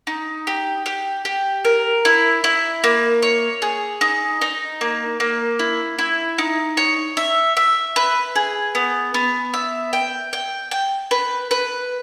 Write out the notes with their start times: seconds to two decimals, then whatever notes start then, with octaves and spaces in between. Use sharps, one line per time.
0.07 D#4
0.47 G4
0.86 G4
1.25 G4
1.65 A#4
2.05 E4
2.44 E4
2.84 A#3
3.22 C#5
3.62 G#4
4.01 D#4
4.41 D#4
4.81 A#3
5.20 A#3
5.59 E4
5.99 E4
6.38 D#4
6.77 C#5
7.17 E5
7.57 E5
7.96 B4
8.36 G#4
8.75 B3
9.14 B3
9.54 E5
9.93 G5
10.33 G5
10.71 G5
11.11 B4
11.51 B4